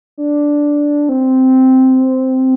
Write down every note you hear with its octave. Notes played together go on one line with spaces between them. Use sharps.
D4
C4